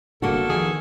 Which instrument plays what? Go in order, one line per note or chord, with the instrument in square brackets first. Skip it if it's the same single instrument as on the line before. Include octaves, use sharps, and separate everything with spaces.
[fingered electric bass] F1 D3 [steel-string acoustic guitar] A#3 F#4 [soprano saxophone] A4
[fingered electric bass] D#3 F3 [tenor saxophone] G#4